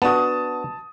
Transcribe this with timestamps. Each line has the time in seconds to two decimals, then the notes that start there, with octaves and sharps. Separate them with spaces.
0.02 B3 D4 F#4 A5 D#6